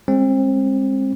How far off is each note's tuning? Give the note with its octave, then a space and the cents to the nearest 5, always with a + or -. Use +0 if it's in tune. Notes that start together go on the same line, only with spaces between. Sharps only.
G#3 -20 C4 +30